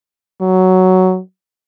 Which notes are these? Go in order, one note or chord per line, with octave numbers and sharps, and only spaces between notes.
F#3